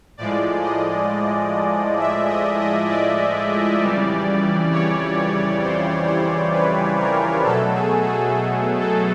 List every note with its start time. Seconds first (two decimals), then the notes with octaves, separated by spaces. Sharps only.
0.17 A2 F3 G#3 D5
0.63 D#5
1.99 E5
2.29 D#5
2.60 D#5
2.90 D5
3.80 F2 C#3 E3 G3
4.72 C#5
5.63 C5
6.08 C5
6.53 B4
6.99 A#4
7.44 B2 F#3 A3 A4
7.74 G#4
8.05 G#4
8.34 A4
8.80 A4